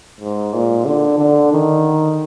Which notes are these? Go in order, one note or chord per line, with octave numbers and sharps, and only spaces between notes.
G#2
A#2
D3
D3
D#3